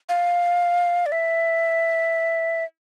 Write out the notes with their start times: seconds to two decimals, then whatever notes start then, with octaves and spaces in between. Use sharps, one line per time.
0.09 F5
1.06 D5
1.12 E5